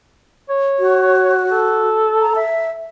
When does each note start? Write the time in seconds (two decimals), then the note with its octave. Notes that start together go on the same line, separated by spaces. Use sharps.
0.50 C#5
0.79 F#4
1.52 A4
2.21 A#5
2.36 E5